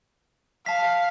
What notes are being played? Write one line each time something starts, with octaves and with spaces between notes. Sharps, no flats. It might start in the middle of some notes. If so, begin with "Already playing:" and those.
F5 A5 B6